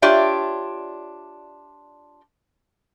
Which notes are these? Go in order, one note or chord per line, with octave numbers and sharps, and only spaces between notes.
D4 F4 G4 C#5 D5 E5